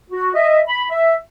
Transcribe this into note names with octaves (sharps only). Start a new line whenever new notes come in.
F#4
D#5 E5
B5
E5